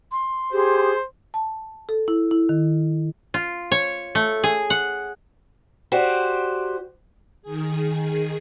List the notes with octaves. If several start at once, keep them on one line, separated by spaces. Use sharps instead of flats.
C6
G4 G#4 C5
A5
A4
E4
E4
D#3
F4
C#5
A3
G#4
F#5
F#4 G4 C5 D5
D#3 G#4